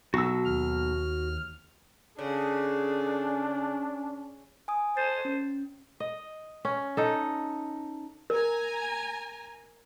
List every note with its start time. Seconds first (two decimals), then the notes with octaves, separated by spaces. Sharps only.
0.14 B1 F#4 E6
0.45 D#2 F6
2.18 C#3 C#4 D4 G#4 A4
4.68 G#5 D#6
4.97 C5 A5 A6
5.25 C#4
6.00 D#5
6.65 C#4
6.97 D#4 A4
8.30 A#4 G#5 A#5